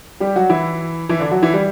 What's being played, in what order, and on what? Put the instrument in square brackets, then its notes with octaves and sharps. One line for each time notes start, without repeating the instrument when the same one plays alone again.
[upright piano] G3 G4
F#3 F#4
E3 E4
E3 E4
D3 D4
F#3 F#4
E3 E4
G3